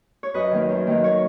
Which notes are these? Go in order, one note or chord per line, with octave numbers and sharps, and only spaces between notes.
C#5
F#2 B4 D#5
D#3 F#3 A#3
F#2
D#3 F#3 A#3
A#4 C#5